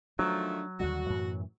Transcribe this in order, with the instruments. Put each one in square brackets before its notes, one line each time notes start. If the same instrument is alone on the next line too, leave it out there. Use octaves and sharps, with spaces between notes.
[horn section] D#3 F3 A3 [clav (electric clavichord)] F#3 [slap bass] D4
[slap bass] D#2 D3 G3 [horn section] F#4
[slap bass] F#2 A2 E3